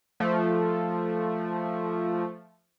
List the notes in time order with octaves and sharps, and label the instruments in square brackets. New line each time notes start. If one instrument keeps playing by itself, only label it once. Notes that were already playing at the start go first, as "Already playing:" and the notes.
[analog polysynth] F3 A3